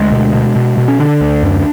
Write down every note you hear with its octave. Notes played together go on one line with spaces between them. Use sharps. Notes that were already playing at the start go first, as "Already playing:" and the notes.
Already playing: D2 G#3
B2
B2
B2
B2
C#4
D3 D4
D2
F#2